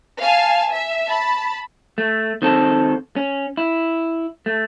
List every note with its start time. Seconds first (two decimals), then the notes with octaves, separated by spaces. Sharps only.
0.22 F5 G#5 A5
0.72 E5
1.09 A5 B5
1.98 A3
2.42 D#3 C4 A4
3.16 C#4
3.57 E4
4.46 A3